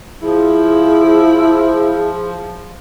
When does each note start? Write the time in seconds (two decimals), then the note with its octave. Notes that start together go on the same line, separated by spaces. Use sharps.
0.22 F3 E4 G#4